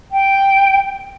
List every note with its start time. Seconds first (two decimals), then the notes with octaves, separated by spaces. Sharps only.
0.12 G5